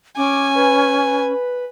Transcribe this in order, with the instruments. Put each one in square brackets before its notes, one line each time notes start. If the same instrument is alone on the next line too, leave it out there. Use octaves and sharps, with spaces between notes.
[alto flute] C#4 [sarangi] G#5 [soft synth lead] D6
[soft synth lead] B4